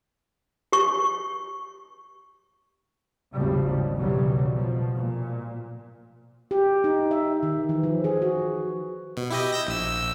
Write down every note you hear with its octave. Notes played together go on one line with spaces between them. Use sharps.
G4 C#6
G#1 D#2 C#3 F3 G3
B1 F2 C#3 E3 F#3 G3
B2 F3
A#2
G4
D#4
E5
D#3
E3
F3
G#4
F#4
B2
E4 G4 D#5
E6 G6 A#6
A#1 E6